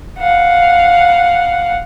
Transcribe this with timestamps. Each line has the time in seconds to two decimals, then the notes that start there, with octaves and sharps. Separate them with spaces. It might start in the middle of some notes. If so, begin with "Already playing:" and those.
0.19 F5 F#5